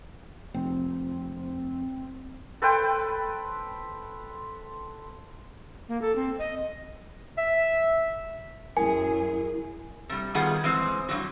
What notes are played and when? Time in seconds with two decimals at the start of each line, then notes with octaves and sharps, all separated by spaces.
0.54 F1 C4
2.62 A4 B4 C5 G5
5.89 A#3
6.02 A4
6.16 C4
6.39 D#5
7.38 E5
8.77 F#2 E4 G#4 A#4 G#5
10.09 C3 G3
10.35 D#3 G3 B3 F4 G#4 F#5
10.64 E3 G#3 C4 C5
11.09 G2 D#3 F#3 F#4